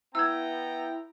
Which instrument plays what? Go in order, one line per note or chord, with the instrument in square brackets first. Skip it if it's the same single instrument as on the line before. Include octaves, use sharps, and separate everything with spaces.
[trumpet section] B3 G5 [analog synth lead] E4 [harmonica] A#5 [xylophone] E6 G#6